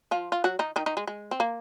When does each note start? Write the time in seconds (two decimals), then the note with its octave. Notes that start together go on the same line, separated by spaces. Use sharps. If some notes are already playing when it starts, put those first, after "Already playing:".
0.11 F3 F4
0.32 F4
0.44 F#3 F#4
0.59 D#3 D#4
0.76 D#3 D#4
0.86 D#3 D#4
0.97 G#3
1.07 G#3
1.31 C4
1.40 A#3